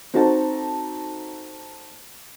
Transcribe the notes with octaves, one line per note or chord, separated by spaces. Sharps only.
C4 D#4 F#4 A4 A5